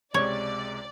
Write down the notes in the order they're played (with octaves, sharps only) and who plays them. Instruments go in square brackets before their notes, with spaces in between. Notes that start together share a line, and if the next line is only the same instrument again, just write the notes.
[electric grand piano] C#2 C3 G#3 [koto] C#5 [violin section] D5